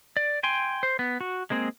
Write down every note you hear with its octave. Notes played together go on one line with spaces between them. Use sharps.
D5
G5 G#5 C6
C5
B3
F#4
G#3 A#3 C4 G#4